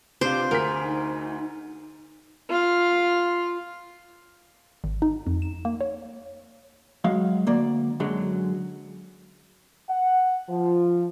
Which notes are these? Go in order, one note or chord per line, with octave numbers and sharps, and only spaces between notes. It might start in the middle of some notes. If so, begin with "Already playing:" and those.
C3 D4 F4 G4 C5
D2 G#4 A#4 B6
D#4
F4 F5
G#1
D#4
F2
E7
A#3
C#5
F#3 G#3 F5
D2 A#3 D5
F#2 D3 F#3 G#3
F#5
F3